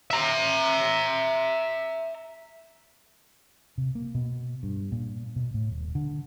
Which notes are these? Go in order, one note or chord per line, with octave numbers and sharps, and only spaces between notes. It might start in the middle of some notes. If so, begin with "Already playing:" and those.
E5 A#5
C3
A#3
B2
G2
A#2
B2
A2
D#1
D3